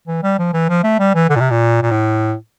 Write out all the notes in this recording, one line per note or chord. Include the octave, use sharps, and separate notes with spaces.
E3
G3
F3
E3
F3
A3
G3
E3
D3
A#2
C3
A#2
A#2
A2